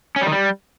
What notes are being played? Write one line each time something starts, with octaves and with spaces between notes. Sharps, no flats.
C#4
G3
D#3
G3